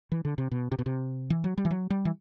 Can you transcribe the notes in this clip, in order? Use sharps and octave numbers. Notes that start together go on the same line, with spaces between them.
E3
D3
C3
B2
C3
B2
C3
E3
F#3
G3
E3
F#3
G3
E3